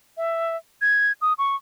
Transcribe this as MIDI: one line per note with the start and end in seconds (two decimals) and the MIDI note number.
0.17 0.56 76
0.81 1.12 92
1.21 1.33 87
1.38 1.56 85